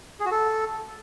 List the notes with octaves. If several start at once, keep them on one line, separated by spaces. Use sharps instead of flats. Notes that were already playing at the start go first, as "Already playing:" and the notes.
G#4
F#4
A4